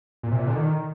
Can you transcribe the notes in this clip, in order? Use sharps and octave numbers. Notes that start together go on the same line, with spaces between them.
A#2
C3
A#2
D3
D#3